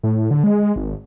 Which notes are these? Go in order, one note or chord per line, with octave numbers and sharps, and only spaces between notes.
A2
D3
G#3
G#1